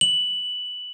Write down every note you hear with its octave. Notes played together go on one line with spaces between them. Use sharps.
F#7